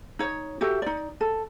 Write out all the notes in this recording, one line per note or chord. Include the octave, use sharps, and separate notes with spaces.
D#4 C#5
F#4 G4 A4 E5
D#4 D5
A4